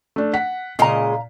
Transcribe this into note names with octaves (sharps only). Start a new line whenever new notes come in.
A3 D4
F#5 B6
A#2 C#3 G#3 D#5 F5 A#5